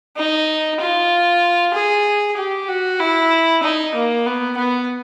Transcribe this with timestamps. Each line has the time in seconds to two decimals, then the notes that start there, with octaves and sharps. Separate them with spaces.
0.17 D#4
0.80 F4
1.74 G#4
2.37 G4
2.68 F#4
3.00 E4
3.62 D#4
3.95 A#3
4.26 B3
4.57 B3